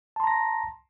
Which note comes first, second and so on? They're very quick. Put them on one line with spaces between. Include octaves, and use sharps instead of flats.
A5 C6 A#5 A#6